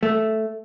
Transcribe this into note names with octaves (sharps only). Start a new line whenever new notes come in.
A3